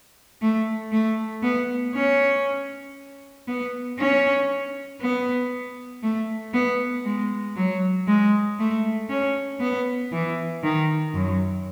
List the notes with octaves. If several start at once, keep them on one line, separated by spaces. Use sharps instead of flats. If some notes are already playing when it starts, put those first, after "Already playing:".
A3
A3
B3
C#4
B3
C#4
B3
A3
B3
G#3
F#3
G#3
A3
C#4
B3
E3
D#3
F#2